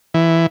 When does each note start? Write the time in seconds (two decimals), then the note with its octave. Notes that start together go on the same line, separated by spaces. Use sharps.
0.14 E3